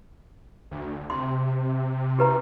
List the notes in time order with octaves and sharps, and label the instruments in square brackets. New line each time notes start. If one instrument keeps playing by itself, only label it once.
[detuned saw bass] D2
[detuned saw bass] C3 [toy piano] C6
[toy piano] G4 B4 A#5